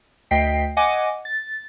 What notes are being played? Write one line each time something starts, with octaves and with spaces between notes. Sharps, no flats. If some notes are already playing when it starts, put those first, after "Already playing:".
D2 D#5 G5 B6 C7
D#5 F#5 G#5 D6
A6